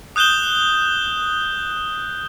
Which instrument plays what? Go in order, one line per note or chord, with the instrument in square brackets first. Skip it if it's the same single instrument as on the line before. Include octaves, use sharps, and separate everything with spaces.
[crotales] D#6 F#6 G6 E7 G7